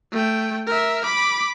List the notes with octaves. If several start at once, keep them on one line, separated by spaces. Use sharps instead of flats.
A3 G5
A#4 E5
B5 D6